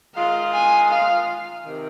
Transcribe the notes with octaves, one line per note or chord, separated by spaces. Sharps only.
D#3 G#3 F4 F5
G#5
F5
C3 D#3